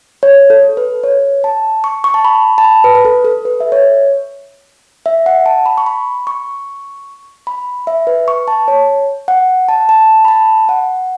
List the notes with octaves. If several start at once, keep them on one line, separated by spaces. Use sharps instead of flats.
C#5
A4
B4
C#5
A5
C#6
C#6
A5
B5
A5
B5
B4
B4
A4
A4
B4
E5
C#5
E5
F#5
A5
B5
C#6
B5
C#6
B5
E5
B4
C#6
A5
C#5
F#5
A5
A5
B5
A5
F#5